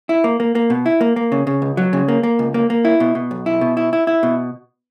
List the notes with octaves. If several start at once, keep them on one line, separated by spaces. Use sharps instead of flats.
E4
A#3
A#3
A#3
B2
E4
A#3
A#3
C#3
C#3
C#2
F#3
C#3
A#3
A#3
C#2
A#3
A#3
E4
B2
B2
B1
E4
B2
E4
E4
E4
B2